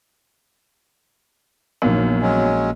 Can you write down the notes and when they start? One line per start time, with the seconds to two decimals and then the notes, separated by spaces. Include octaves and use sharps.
1.82 A#1 F#2 B2 D#3 A#3
2.22 F#3 G#3 C#4